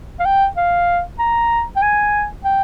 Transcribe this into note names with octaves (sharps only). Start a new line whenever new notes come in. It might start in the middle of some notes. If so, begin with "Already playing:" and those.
F5
G5
F5
A#5
G5
G#5
G5